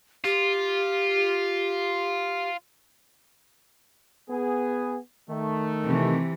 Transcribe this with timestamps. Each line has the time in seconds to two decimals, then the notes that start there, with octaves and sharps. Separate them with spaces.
0.24 F4 G4
4.30 B3 G#4
5.30 D#3 A3
5.84 C3 E3